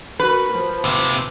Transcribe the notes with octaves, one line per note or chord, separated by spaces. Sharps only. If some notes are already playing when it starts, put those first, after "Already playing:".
F#4 A#4 B4
F3
D#2 C3